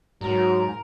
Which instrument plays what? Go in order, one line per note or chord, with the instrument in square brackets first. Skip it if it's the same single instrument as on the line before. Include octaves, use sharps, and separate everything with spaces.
[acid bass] G#2 [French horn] F#3 [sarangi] A#4